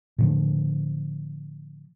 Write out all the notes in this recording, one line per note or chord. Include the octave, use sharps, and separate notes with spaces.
A2 D3 F3